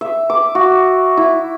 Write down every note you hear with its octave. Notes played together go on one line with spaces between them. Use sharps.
E5
D6
F#4
E4